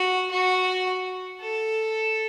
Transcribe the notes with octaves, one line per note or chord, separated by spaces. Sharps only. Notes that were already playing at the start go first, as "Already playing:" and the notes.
Already playing: F#4
F#4
A4